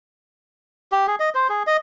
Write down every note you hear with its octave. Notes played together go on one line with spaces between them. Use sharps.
G4
G#4
D#5
C5
G#4
D#5